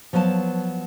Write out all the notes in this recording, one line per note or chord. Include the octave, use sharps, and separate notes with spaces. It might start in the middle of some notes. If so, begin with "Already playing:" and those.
F3 F#3 B3 G#5 A5